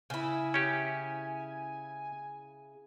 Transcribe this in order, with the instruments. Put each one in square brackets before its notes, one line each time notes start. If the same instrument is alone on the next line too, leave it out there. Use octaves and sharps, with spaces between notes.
[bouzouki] C#3 E4 [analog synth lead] G#5
[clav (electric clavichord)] C#4 G4